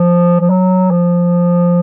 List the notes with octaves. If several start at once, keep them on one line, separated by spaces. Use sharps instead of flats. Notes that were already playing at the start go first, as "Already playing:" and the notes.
Already playing: F3
F3
F#3
F3